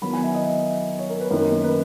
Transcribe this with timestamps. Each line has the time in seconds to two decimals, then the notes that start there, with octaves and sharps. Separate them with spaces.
0.02 D#3 F#3 B3 E4 B5
0.13 G#5
0.24 E5
0.35 D#5
0.99 C#5
1.09 A#4
1.21 B4
1.31 F#2 D#3 A#3 D#4 A#4
1.64 B4